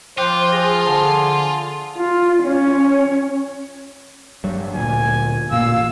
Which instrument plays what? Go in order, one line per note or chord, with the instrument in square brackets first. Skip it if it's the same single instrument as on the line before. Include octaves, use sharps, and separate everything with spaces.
[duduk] F3 [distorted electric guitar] F4 [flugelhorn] C5 [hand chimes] G5 D6 F#6
[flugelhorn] G#4 [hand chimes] A#6
[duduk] D3 [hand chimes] A5
[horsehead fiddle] F4
C#4 C#5
[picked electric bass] G2 F#3
[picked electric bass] D2 A#2 [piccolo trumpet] G#5
[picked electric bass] A1 A#2 A#3 [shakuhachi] F5 [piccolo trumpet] E6